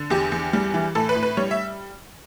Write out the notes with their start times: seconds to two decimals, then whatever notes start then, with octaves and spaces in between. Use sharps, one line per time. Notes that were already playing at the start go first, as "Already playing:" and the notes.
Already playing: D3
0.10 E2 G4
0.32 E2
0.53 G3
0.74 E3
0.95 A2 A4
1.09 B4
1.15 A2
1.23 B4
1.37 G3 C#5
1.51 E5